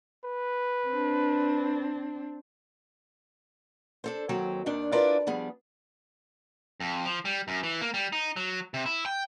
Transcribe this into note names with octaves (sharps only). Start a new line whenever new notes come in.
B4
C4 D4
D4 A4 C5
D#2 F#3 C4 G5
D#2 D#3 D4
D4 E4 F4 A#4 B4 D5
F3 G3 B3 G#4
F2
F3
G3
F#2
E3
A#3
G3
D#4
F#3
C3
E4
G5